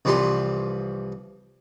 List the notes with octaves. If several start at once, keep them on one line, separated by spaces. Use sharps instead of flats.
C2 E3 F3 G3 C6